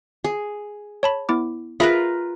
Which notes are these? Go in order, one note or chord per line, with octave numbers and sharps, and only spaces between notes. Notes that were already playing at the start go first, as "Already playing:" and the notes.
G#4
C#5 A5 B5
B3 E4 D6
F4 G#4 A#4 B4 E5 B5